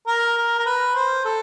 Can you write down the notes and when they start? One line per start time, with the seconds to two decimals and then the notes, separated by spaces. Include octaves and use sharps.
0.07 A#4
0.37 A#4
0.58 A#4
0.66 B4
0.95 C5
1.25 A4